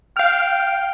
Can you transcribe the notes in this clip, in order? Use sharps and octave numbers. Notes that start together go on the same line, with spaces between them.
F5 G5 F6